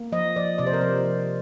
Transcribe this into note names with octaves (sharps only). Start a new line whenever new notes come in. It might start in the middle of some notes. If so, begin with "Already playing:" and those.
Already playing: A#3
F3 D#5
F3 D5
C3 D5
C5
A#4
F3 C5
F3